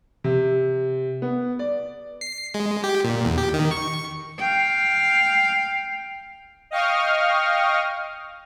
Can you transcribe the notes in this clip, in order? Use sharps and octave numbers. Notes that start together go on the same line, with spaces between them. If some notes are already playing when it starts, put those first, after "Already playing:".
C3
B3
D5
C7
G#3
G4
A#2
E2
G4
D#3
C#6
F5 G5
D#5 F5 G5 C#6 D#6 F6